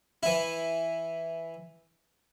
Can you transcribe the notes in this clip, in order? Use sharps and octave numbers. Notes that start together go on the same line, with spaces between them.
E3 E4